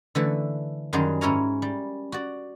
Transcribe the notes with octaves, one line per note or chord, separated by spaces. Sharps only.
D3 E3 A3
F#2 D#3 F#3 G3 G#4 C6
G#2 C#4 E4 A#4 C#5 A#5
G3
F#4 D5